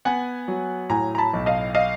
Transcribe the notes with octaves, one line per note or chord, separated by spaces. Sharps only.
B3 F#5 G#5
F#3
A2 G#5 A#5
A#5
A5 B5
B1
D#5 F5
D#5 F5